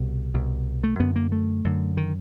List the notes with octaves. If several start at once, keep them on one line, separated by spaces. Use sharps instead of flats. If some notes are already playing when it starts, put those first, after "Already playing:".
Already playing: C2 B2 G3
C2 B2
A3
F#2 D3 B3
A#3
A3
F#2 D3
D#3